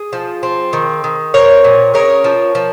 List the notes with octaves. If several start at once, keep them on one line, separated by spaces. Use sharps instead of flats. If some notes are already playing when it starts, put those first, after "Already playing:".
Already playing: G#4
F3
C4
D#3
D#3
C4 A#4 C#5
A#2
C#3 A#4 C#5
F3
F3